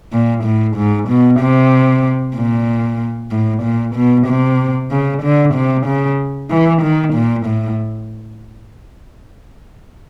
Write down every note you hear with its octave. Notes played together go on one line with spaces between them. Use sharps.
A#2
A2
G#2
B2
C3
A#2
A2
A#2
B2
C3
C#3
D3
C3
C#3
E3
D#3
A#2
A2